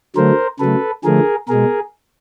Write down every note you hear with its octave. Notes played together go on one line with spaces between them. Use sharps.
D3 F#3 A3 A#4 C5
C#3 F#3 A3 A4 B4
D3 F3 A3 G#4 A#4
B2 G#3 G#4 A#4